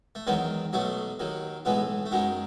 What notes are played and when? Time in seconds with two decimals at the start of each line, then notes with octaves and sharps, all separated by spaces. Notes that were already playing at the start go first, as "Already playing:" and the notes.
0.15 A3
0.27 E2 D#3 F#3 G#3 B3
0.73 B1 B2 F#3 A3
1.19 D#2 D#3 F#3
1.65 B1 A2 E3 G#3 B3
2.06 A3
2.11 F#2 D#3 F#3 G#3 B3